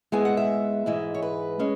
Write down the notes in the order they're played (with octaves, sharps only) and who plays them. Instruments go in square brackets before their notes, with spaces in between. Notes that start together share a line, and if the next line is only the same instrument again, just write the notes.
[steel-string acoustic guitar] G#2 G#3 B3 E4 G#5
F#5
E5
G#2 E3 G#3 E4
C#5
B4
G#3 C#4